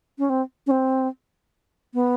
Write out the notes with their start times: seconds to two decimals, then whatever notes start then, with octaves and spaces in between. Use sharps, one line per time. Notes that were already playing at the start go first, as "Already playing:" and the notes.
0.19 C#4
0.30 C4
0.67 C#4
0.71 C4
1.94 B3